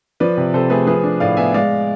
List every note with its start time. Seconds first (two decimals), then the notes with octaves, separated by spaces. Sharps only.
0.20 F3 B4 D5
0.37 C3
0.53 C3 A4 C5
0.70 A3 G#4 B4
0.87 F3 G#4 B4
1.03 D4
1.20 A2 D5 F5
1.37 B3 E5 G#5
1.54 G#3 D5 F5